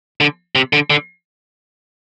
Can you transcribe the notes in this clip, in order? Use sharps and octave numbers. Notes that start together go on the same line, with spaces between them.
D3
C3
D3
D3